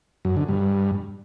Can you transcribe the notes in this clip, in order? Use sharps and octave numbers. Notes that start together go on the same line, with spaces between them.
F#2
D3
G2